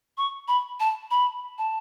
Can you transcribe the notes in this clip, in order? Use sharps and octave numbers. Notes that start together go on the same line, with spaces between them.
C#6
B5
A5
B5
A5